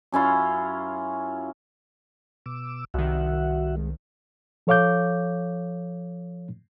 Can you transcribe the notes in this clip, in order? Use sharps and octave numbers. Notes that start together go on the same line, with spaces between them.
F#2 C#4 E4 F4
B2 D6 E6
C2 D#3 F#4 E5 F#5
G#3
F3 A4 C#5 F5 D6 G6